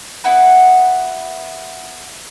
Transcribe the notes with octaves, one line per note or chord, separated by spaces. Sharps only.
B3 E4 F#4 B4